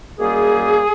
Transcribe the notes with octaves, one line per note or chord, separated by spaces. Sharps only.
F#2 D#3 G3 A#3 G#4